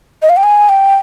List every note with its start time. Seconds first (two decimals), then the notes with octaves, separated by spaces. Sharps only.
0.22 D#5
0.29 F5
0.37 G5
0.43 G#5
0.69 G5